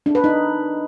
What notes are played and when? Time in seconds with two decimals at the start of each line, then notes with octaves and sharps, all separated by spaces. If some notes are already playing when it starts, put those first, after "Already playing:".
0.06 D4
0.15 B4
0.24 D#4